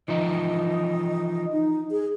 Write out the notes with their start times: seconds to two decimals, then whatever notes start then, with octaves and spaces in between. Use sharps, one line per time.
0.08 E3 F3 D#4 D#5
1.52 D#4
1.91 G#4